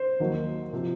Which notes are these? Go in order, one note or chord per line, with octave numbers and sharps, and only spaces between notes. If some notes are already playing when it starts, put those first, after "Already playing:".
Already playing: C5
D#2 D#3 F#3
C3 F3